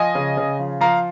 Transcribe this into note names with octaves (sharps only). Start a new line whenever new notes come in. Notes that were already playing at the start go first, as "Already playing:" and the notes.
Already playing: F3 D#5 G#5
C#3
C#3
F3
F3 F5 A#5